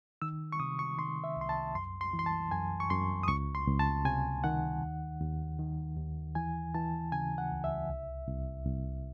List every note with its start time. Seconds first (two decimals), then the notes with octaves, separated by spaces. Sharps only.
0.22 D#3 E6
0.53 C#6
0.60 C3 D#6
0.79 C#6
0.98 D#3 C6
1.24 E5
1.36 C2 C6
1.49 A5
1.75 F#2 C6
2.01 C6
2.13 E3
2.19 C6
2.26 A5
2.51 F#2 G#5
2.80 C#6
2.90 F#2 C6
3.23 D#6
3.28 C#2 C#6
3.55 C6
3.67 C#2
3.79 A5
4.05 C3 G#5
4.44 D#3 F#5
4.82 D#2
5.20 D#2
5.59 D#3
5.97 D#2
6.35 E3 G#5
6.74 E3 A5
7.12 C#3 G#5
7.38 F#5
7.51 C#2
7.64 E5
7.89 C2
8.28 C2
8.66 C2